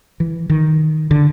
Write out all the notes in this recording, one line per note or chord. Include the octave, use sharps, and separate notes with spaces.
E3
D#3
D3